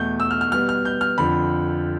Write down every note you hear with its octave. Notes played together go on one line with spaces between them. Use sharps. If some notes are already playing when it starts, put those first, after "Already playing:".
Already playing: E2 B2 A3 G6
E6
F6
F6
B2 G3 B3 F6
F6
G6
F6
F2 D3 F3 B5